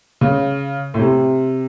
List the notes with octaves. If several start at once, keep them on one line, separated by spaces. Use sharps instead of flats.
C#3
A2
C3